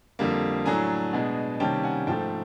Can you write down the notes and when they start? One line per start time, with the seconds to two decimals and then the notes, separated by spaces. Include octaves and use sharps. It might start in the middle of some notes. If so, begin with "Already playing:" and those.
0.19 F2 D3 G3 A#3
0.66 A2 F#3 A3 D4 G#5 A#5
1.13 B2 G#3 B3 D4
1.60 C3 D#3 G3 A#3 C#4 G5 A5
1.84 F#5 G#5
2.07 G#2 F3 A3 G5 A5